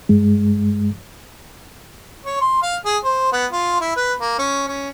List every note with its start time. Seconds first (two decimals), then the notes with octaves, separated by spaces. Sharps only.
0.09 G2 G#3
2.25 C#5
2.41 C6
2.62 F5
2.85 G#4
3.04 C5
3.32 B3
3.52 F4
3.80 E4
3.96 B4
4.20 A#3
4.39 C#4
4.68 C#4